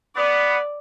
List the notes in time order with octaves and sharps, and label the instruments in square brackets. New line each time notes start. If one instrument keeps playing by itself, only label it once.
[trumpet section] B3 [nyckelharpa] D5